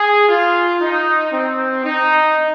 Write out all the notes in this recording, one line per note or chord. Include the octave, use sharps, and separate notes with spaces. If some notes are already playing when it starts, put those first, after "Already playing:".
Already playing: G#4
F4
D#4
C4
D#4